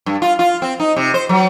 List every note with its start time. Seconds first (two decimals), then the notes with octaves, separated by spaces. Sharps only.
0.06 G2
0.22 F4
0.39 F4
0.62 C4
0.80 D#4
0.96 C3
1.14 C5
1.29 F#3